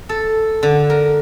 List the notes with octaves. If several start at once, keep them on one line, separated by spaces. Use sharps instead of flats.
A4
D3
A#4